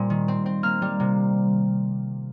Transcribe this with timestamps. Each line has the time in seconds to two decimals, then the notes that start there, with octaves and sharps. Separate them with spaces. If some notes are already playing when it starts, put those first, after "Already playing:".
Already playing: A#2 G3 C4
0.10 D#3
0.28 C4
0.46 C4
0.63 A#3 F6
0.82 G3
1.00 C3